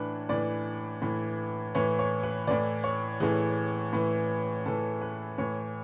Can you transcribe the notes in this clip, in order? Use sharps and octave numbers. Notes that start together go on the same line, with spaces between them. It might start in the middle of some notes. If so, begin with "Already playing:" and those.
Already playing: A2 E3 D4 B4
A2 E3 D5
A2 E3
A2 E3 C#5
C#5
B4
A2 E3 D5
C#5
A2 E3 G#4
A2 E3
A2 E3 A4
B4
A2 E3 C#5